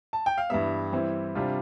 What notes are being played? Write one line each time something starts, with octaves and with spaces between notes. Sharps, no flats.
A5
G5
F5
G2 E3 G3 B3 E5
E3 G3 C4 E4
C3 G3 D4 F4